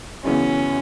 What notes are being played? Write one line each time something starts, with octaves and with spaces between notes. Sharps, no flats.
F#2 C#3 E3 B3 C#4